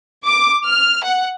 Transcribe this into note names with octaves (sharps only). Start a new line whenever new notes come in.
D6
F6
F#5